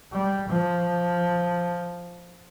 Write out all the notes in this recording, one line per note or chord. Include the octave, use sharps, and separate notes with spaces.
G3
F3